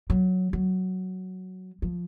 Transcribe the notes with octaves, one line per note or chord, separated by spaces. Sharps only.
F#3
F#3
F3